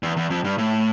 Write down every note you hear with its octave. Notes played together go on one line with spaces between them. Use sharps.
E2
E2
F2
G2
A2